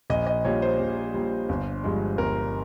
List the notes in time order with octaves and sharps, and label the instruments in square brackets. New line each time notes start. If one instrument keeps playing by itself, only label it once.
[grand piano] A#1 D#5
D#5
A#2 G3 C#5
C5
A#1
A#2 G3
G1
G2 F3 G#3
G1 A#4